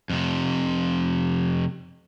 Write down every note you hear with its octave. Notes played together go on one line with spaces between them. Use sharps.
F2 C3